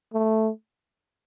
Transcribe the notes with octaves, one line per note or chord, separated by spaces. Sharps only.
A3